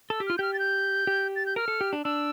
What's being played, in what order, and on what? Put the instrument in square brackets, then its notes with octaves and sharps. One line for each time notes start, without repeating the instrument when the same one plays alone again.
[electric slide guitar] A4 [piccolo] E6
[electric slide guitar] G4
[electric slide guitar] F4 [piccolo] F6
[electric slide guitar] G4 [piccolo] F6 G6
[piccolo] A6
G6
[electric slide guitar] G4
[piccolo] A6
G6
[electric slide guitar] A#4 [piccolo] F6
[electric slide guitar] A4
G4
D4
[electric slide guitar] D4 [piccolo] E6